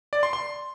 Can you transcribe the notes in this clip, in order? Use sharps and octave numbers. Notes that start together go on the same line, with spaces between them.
D5
C6
C6